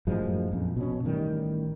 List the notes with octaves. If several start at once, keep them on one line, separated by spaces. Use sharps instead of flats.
F#2 A2 F3 G#3
A#1 F2
B2 C#4
A1 D#3 G3